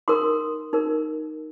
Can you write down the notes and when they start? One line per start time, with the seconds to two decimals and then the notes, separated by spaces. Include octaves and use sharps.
0.08 D#4 A#4 C6 D#6
0.73 D#4 A#4